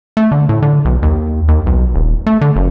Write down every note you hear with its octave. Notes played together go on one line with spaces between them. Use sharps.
A3
D3
A2
D3
B1
D#2
D#2
B1
D#1
A3
D3
F#1